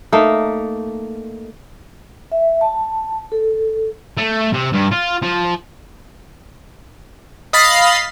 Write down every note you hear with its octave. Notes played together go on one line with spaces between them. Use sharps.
A3 A#3 D#4
E5
A5
A4
A3
C3
G2
F4
F3
D#5 F5 B5 A6 B6 C7